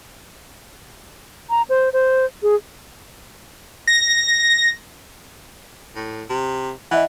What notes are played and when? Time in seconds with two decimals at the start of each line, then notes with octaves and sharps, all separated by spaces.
1.50 A#5
1.69 C5
1.93 C5
2.43 G#4
3.87 A#6
5.95 A2
6.30 C3
6.91 E3 D#5 E5 F#5